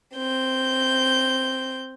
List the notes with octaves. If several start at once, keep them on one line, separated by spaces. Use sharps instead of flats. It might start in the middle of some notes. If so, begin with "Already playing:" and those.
C4 G6